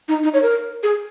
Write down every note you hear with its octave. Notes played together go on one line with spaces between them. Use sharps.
D#4
D#4
C#5
A#4
G#4